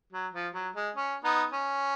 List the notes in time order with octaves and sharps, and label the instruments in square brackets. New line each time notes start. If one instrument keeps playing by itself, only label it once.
[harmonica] F#3
F3
F#3
G#3
C#4
B3 D#4
C#4